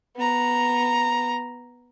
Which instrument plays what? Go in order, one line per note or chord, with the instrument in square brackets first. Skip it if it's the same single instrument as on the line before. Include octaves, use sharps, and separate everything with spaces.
[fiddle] B3 A#5